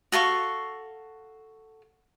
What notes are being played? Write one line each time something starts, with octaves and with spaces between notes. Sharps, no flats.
F#4 A4 F5 C#6